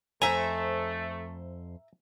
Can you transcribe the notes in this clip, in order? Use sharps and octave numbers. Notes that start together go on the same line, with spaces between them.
F2 A3 C5 E5 G#5 A#5